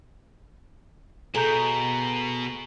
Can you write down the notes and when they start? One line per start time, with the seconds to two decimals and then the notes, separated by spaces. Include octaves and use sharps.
1.35 B2 G#4 A4 A#5 G6